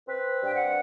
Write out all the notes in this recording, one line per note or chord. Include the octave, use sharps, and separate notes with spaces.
C4 B4
G2
G5
F#5